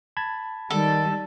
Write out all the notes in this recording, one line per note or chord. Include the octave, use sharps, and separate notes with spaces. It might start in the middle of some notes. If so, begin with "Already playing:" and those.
A5 B5 G#6
D#3 G3 A4